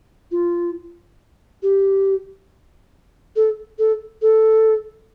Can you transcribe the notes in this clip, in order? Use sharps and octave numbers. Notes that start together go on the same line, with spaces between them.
F4
G4
A4
A4
A4